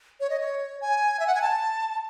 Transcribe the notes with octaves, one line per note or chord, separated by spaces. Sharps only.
C#5
D#5
C#5
G#5
E5
F#5
G#5
A5